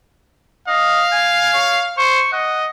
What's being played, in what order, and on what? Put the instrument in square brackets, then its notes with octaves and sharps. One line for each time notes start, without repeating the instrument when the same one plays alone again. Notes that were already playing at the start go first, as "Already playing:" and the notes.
[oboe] D#5 [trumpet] F5
[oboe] G#5
C#5
[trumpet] C5 [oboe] C#6
[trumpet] D#5 [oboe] F#5